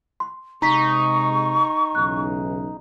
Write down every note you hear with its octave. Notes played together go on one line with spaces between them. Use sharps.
C6
C3 G#3 D#4 A#5 C#6 B6
B1 E2 C#3 F#6